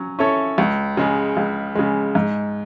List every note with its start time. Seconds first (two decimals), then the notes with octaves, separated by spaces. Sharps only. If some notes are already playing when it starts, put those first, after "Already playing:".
Already playing: F#3 C#4
0.19 C#4 E4 A4 C#5
0.58 C#2
0.97 C#3 G#3
1.37 C#2
1.75 C#3 G#3
2.15 G#2